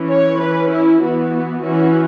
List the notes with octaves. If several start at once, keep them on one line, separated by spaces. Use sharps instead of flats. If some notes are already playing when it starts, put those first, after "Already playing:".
Already playing: E3 C#4
C#5
E3 C#4 B4
E4
E3 B3 F#4
E3 C#4 F#4